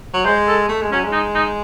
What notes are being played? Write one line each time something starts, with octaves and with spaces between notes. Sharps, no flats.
F#3
G#3 C5
A4
A3
G#3
F#3 C#4
G#3
D#4
D#4